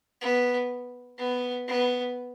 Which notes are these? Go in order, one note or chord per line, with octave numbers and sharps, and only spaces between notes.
B3
B3
B3